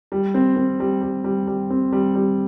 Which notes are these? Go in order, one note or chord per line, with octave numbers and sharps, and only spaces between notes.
G3
C4
C4
G3
G3
G3
G3
C4
G3
G3